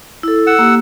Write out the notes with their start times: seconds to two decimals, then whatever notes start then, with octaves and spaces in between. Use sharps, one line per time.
0.23 E4 A4
0.47 F#5 E6
0.59 A#3 G4